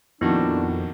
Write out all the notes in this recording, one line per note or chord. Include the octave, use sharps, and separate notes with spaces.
F2 A#2 D#3 B3 D4 E4 F#4